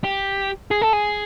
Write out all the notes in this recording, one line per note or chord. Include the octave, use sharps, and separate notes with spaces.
G4
G#4
A4
G#4